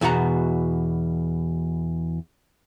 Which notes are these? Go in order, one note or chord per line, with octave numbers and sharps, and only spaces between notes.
E2 B2 F#4 F#5 A#5